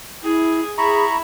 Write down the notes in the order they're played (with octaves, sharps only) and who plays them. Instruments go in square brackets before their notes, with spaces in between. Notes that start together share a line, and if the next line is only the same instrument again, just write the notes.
[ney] E4 [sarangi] G#4
[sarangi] E4 [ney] G#4 [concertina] A#5 B5 C#6